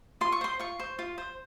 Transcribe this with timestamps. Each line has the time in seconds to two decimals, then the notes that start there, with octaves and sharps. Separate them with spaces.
0.21 F4 C6
0.32 C#6
0.41 C5 C6
0.59 F4 C#6
0.79 C5
0.99 F4
1.18 C5